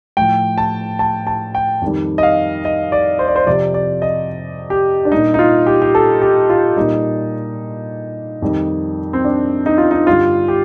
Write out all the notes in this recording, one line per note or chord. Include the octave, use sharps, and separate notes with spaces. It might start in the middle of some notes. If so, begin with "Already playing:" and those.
A2 F3 G5
A5
A5
A5
G5
F2 D#3 G3
D#5
F5
D#5
D5
C5
D5
C5
F2 C3 F3 D5
D5
D#5
G4
D4
A#2 G3 D#4
D#4
F4
G4
G4
A4
G4
F4
A#2 G3 D#4
F2 D#3 G3
C4
D4
D#4
F4
D#4
G2 D3 G3 F4
G4